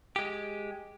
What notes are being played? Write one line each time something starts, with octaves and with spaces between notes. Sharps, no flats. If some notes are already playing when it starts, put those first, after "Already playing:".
G#3 G4